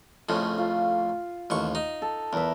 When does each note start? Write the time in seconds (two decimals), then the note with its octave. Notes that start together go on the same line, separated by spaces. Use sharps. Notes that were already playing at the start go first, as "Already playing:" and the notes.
0.29 F2 A2 C#3
0.58 F4
1.50 A1 D#2 C#6
1.75 D#4
2.02 A4
2.33 E2 A#4 B4 E5